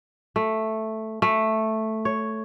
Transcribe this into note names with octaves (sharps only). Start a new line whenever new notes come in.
A3
A3
C#5